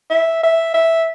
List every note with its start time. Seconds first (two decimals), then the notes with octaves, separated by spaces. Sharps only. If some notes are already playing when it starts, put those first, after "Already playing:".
0.10 E5
0.43 E5
0.74 E5